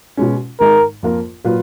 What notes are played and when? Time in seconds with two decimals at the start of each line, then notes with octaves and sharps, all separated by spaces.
0.17 B2 G#3 C#4
0.60 G#2 D#3 G#3 D#4 A#4
1.03 F2 F3 A#3 F4 A#4
1.44 A#2 F#3 A#3 F4 B4